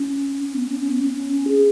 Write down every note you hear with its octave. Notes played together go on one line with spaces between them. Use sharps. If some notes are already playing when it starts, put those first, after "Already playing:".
Already playing: C#4
C#4
B3
C#4
C#4
B3
C#4
C#4
G#4